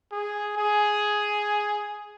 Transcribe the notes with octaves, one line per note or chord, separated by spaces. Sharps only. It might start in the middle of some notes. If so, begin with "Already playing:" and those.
G#4
G#4